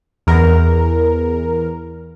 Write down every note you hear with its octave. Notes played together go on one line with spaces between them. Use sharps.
E2 A#4